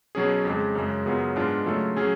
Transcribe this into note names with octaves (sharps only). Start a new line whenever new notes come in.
B2 F#3 C#4 G#4
F2 C#3 G#3
F#2 C#3 G#3
F#2 C#3 F#3 B3 F4
G#2 G#3 B3 D4 F4
C#3 F#3 A3 F4 A4
F#3 C#4 G#4